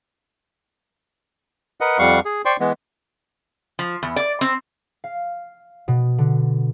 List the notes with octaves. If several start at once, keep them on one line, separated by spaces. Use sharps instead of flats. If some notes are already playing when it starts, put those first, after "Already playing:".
A#4 B4 D#5 F#5
F2 G3 F5 F#5 C#6
G#4
C5 D5 G5 C6 C#6
E3 G#3 B3
F3
E2
D5
C4
F5
B2
D3